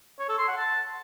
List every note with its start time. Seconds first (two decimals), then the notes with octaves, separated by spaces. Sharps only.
0.19 C#5
0.29 A4
0.38 C6
0.48 F#5
0.58 A5